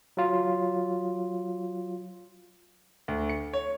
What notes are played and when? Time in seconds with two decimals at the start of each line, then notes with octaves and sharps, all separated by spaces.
0.17 F#3 F4
3.08 D2
3.29 C#7
3.53 C#5